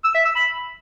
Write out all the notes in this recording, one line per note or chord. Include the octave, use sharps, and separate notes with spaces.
E6
E5
E6
B5